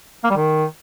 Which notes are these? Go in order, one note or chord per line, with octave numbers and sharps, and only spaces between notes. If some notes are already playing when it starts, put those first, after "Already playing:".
A#3
G3
D#3